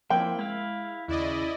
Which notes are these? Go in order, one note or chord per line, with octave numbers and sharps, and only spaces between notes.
F3 A#3 C4 E4 G5
G#3 E4 F5
D#2 C#3 E4 D5 D#5